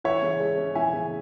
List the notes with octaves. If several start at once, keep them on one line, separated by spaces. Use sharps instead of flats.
E3 C#5 E5
C#3
G#3
C#4
E3 E5 G#5
C#3